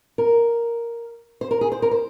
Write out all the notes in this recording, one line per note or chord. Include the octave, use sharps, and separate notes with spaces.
A#4
C5
A#4
G#4
C5
A#4
C5